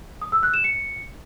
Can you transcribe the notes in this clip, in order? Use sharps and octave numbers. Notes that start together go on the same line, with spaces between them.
D#6
E6
F#6
E7
C#7